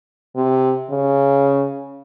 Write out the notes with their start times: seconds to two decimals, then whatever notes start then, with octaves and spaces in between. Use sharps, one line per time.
0.36 C3
0.90 C#3